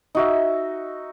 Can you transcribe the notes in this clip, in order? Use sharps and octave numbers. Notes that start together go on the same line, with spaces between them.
D#4 F#4 E5